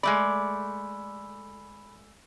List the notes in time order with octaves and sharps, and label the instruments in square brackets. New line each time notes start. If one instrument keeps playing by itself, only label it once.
[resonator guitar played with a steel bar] G#3 A3 D5 [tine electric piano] B5